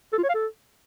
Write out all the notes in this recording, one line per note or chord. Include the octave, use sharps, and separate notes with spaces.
A4
F4
C#5
F5
A4